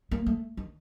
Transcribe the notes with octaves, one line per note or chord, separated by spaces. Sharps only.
A#3
A3
D#3